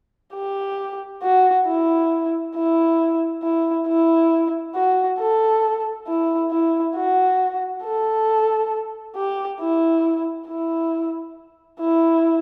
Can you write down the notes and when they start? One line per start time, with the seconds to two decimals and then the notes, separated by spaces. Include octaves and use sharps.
0.34 G4
1.23 F#4
1.67 E4
2.55 E4
3.43 E4
3.87 E4
4.75 F#4
5.19 A4
6.07 E4
6.51 E4
6.95 F#4
7.84 A4
9.16 G4
9.60 E4
10.48 E4
11.80 E4